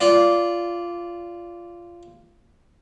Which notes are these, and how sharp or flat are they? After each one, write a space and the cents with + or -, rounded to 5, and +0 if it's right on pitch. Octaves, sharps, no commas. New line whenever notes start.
F4 -15 D5 -15